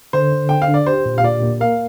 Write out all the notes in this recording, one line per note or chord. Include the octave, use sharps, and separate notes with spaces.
D3 C5
D3
D3 G5
F5
D4
D5
G4 C5
A#2
F5
A#2 D5
A#3
A#4 F5